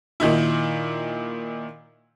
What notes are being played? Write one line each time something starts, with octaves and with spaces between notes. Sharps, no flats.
A#2 D#3 D#4 E4